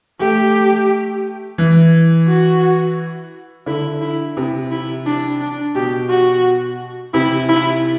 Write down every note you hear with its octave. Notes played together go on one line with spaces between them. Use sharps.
A3 G4
E3
F#4
D3 E4
E4
C3 E4
E4
D4
D4
B2 G4
F#4
C3 E4
E4